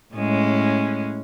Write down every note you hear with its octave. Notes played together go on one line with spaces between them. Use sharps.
A2 G#3 C#4